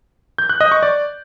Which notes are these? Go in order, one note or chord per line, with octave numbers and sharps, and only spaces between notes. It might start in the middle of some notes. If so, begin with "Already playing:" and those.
G6
F#6
D#5
C#6
D5